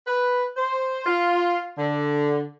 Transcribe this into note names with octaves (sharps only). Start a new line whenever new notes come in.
B4
C5
F4
D3